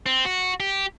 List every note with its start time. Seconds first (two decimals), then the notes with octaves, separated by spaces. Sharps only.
0.06 C4
0.25 F#4
0.60 G4